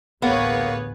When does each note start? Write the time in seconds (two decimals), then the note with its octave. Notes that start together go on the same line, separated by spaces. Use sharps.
0.22 A1 D2 A2 A#3 B3 G#4 B4 C#5